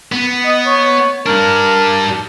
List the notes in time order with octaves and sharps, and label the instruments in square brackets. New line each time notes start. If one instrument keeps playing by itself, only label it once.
[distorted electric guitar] B3
[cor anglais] D#5
C#5
[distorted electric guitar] G3 D4 [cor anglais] A#4